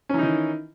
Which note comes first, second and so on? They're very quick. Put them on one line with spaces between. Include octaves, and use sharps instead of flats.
C#4 E3 D#4 D#3